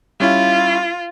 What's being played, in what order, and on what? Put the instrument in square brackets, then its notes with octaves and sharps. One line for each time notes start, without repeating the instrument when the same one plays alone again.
[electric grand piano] G3 C#4 E4 [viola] F4